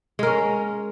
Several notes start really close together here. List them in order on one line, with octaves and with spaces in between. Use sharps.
G#3 A#4 C#4